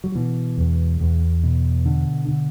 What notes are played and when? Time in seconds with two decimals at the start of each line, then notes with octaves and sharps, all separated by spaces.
0.04 F#3
0.15 B2 E3
0.58 E2
1.00 E2
1.43 B2
1.86 D3
2.28 D3